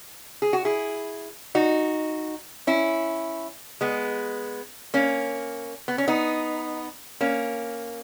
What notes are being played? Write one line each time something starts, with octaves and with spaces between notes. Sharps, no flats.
G#4
F#4
E4 G#4
D#4 F#4
C#4 E4
G#3 B3
A#3 C#4
B3
C#4
B3 D#4
A#3 C#4